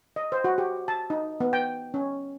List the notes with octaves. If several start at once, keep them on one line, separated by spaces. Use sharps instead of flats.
D#5
C5
F#4
G4
A5
D#4
B3
G5
C#4